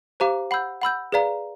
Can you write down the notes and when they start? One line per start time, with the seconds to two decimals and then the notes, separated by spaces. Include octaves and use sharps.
0.20 G4 C5 F5 A#5 D6
0.51 F#5 B5 E6 G6
0.82 F#5 B5 E6 G6
1.12 G#4 B4 D5 F5 A#5